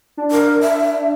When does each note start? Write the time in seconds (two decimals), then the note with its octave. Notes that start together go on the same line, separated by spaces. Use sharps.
0.17 D4
0.31 A#4
0.61 E5